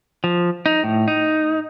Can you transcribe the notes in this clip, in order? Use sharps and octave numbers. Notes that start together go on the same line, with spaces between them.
F3
D#4
A2
D#4